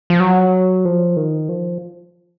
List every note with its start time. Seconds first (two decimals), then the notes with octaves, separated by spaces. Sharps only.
0.10 F3
0.20 F#3
0.85 F3
1.17 D#3
1.49 F3